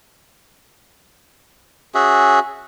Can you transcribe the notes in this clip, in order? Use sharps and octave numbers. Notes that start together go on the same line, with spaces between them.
C#4 F#4 G#4 E5